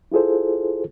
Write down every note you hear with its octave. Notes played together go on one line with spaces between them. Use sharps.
E4 F4 G#4 A4 C5